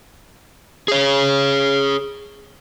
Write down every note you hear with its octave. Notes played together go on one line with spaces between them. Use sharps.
G#4 C#5